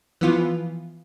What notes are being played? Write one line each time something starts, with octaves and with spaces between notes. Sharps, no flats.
E3 F3 B3 F4